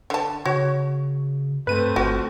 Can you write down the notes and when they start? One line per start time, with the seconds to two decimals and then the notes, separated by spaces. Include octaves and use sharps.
0.10 D3 A5
0.45 C#3 F#4 C#5
1.67 G2 A3 C4 B4 D#7
1.96 G1 F3 F#4